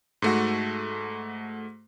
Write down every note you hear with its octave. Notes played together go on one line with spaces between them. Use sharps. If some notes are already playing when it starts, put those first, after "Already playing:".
G#2 A3 F#4